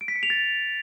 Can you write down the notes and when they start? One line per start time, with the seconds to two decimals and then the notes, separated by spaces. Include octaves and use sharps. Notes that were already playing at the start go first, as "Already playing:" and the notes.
0.01 D7
0.08 B6
0.16 C#7
0.23 F7
0.30 A6